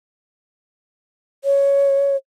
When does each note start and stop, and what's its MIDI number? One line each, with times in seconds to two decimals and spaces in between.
1.44 2.16 73